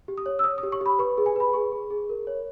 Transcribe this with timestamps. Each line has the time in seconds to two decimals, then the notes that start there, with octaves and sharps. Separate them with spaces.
0.08 G4
0.18 D#6
0.26 C#5
0.39 E6
0.44 C#5 D#6
0.58 D#6
0.63 G4
0.72 C#6
0.81 G4 B5
0.99 B4 C#6
1.18 G#4
1.26 G#5
1.36 B4 B5
1.53 G#4 C#6
1.72 G#4
1.90 G#4
2.09 A#4
2.27 C#5